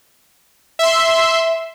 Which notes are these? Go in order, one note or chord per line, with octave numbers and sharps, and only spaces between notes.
E5 C6